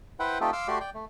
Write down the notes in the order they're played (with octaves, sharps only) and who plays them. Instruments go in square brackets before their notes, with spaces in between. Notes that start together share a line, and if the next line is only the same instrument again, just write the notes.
[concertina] E4 B4 C5 F#5 G5
A3 C4 D#4 F4 G4 A4
F5 C6 D6 E6
A3 F#4 G4 D5 C6
D5 G5
A3